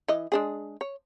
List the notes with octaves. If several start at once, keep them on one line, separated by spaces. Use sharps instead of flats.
E3 D#5
G#3 D4 G#4
C#5